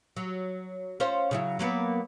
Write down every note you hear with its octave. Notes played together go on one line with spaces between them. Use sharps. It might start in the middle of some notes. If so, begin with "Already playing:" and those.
F#3
C#4 F4 C5
C#3 F#3 E4
F#3 A#3 B3